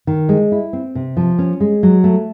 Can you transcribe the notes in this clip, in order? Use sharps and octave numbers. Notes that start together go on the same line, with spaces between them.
D#3
G#3
E4
C4
C3
F3
C#4
G#3
F#3
A3